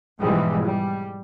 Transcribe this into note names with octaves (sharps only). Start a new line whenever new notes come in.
G#2 B2 E3 F3 G3 G#3
G3